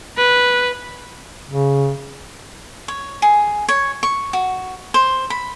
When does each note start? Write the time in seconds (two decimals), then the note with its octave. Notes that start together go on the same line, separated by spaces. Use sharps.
0.17 B4
1.47 C#3
2.88 C#5
3.22 G#4
3.68 C#5
4.03 C#6
4.33 F#4
4.94 C5
5.30 B5